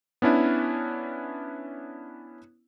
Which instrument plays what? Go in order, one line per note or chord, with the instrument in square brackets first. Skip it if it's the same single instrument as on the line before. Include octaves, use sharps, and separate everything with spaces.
[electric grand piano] B3 C#4 D4 E4